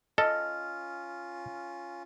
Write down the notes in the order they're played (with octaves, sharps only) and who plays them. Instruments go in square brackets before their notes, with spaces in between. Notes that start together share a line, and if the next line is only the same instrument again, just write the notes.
[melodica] C#4 F4 [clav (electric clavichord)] A4 [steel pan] D#5 [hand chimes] F6